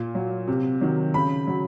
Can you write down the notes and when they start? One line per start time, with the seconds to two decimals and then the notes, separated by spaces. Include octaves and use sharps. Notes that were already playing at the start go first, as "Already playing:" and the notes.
Already playing: A#2
0.15 F#3
0.47 C3
0.81 D#3 F#3
1.14 C#3 B5
1.47 F#3